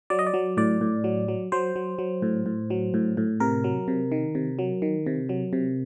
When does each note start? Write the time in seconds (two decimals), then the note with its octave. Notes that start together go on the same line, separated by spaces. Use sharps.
0.10 F#3 D5
0.19 D#5
0.27 D5
0.34 F#3
0.57 A2 D5
0.81 A2
1.04 F#3
1.28 F#3
1.52 F#3 C5
1.76 F#3
1.98 F#3
2.22 A2
2.46 A2
2.70 F#3
2.94 A2
3.17 A2
3.40 C3 A#4
3.64 F#3
3.88 C3
4.12 D#3
4.35 C3
4.59 F#3
4.82 D#3
5.06 C3
5.29 F#3
5.53 C3